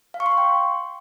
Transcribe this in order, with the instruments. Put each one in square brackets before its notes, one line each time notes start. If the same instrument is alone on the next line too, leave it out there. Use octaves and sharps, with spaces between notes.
[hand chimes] F5
C#6
C6
C#6
G5